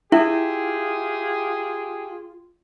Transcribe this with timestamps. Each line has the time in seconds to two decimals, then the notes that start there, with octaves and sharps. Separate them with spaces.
0.12 E4 F4 G4 G#4 E5